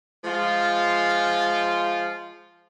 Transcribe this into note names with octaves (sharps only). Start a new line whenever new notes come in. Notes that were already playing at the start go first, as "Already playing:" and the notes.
F3 G#3 F4